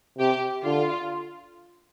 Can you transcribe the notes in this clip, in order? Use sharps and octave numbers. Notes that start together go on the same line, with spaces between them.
C3 G4
D3 F4